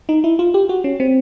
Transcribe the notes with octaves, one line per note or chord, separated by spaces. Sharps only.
D#4
E4
F4
G4
F#4
C#4
C4